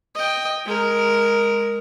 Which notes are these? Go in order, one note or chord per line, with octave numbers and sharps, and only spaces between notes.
D#5 G5
G#3 A#4